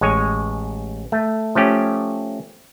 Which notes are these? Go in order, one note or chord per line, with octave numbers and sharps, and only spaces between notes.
A1 G#3 C#5 G#5
A3
F3 A3 C#4 G4